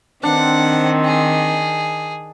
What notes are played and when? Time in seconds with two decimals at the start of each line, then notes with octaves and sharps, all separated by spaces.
0.23 D#3 C4 D4 F#5
1.05 G#4